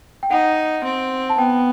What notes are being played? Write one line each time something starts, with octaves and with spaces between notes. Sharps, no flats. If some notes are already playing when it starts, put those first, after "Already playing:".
G5
D#4 F#5
C4
A5
B3 G5